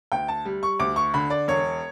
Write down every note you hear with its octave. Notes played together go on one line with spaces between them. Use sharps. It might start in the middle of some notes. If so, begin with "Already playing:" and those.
D2 G5
A5
G3
C#6
D2 D6
C#6
D3 B5
D5
E1 C#5